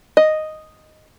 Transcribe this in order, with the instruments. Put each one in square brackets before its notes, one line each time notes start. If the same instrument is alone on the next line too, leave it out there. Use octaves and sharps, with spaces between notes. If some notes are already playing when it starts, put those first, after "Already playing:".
[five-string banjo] D#5